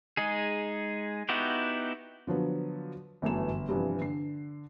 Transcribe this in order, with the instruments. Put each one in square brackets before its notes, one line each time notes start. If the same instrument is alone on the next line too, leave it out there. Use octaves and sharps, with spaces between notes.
[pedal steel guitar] G#3 D#4 G#4
B3 D#4 E4 F#4 G4
[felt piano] D3 F3 F#3 B3
G1 F#2 E3 A3 B3 E7
G1
G2 C3 E3 F3
D3 C7